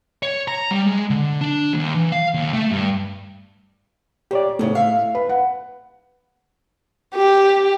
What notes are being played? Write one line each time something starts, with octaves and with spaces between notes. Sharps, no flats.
C#5
A#5
G3
G#3
D3
D4
D#2
E3
F5
D#2
A3
G2
A#2 G4 C#5 D5
D2 A2 C#3 A3
E5 F5
B4 B5
F#5
G4